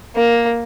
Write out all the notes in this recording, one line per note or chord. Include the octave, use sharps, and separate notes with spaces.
A#3